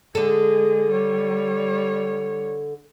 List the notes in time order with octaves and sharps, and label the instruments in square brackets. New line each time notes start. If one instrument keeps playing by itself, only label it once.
[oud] D3 A4 [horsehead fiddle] G#3 G#4
[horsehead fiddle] G3 C#5